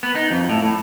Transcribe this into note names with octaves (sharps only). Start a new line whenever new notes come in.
B3
D#4
F2
A2
A2